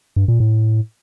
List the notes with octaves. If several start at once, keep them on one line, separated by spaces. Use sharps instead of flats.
G2
A#2
A2